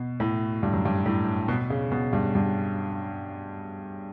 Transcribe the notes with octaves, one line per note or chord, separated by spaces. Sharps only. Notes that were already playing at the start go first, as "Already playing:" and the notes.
Already playing: B2
A2
G2
F#2
G2
A2
B2
C#3
B2
G2
G2